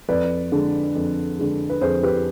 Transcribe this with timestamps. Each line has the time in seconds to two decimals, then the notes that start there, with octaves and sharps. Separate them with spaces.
0.09 F2 B4 D5
0.52 D3 G#3
0.95 F2
1.38 D3 G#3
1.70 B4
1.81 F2 G#4 C5
2.03 G4 B4